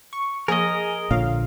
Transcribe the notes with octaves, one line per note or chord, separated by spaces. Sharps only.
C#6
F3 A#3 G#4 A#4 D#5
A#1 A#2 D3 F4 C#5 F5